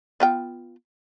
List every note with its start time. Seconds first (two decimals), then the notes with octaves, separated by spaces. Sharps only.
0.20 B3 F4 G5